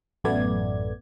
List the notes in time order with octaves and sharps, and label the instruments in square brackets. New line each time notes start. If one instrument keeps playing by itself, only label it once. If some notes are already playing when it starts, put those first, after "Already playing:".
[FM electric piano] A1 F#2 A3 B3 D5 G#6